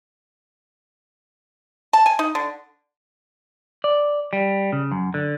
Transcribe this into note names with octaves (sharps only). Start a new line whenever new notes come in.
A5
G#5
D#4
D3
D5
G3
C#3
F#2
D3